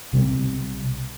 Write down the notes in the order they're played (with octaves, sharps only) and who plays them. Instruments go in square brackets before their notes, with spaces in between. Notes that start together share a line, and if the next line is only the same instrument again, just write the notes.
[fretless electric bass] B1 C3 G3 C4